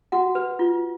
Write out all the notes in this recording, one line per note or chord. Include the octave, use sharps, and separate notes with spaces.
F#4 F#5
B4
F4